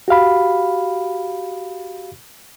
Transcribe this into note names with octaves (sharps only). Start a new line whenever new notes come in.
F#4 G4 F5 B5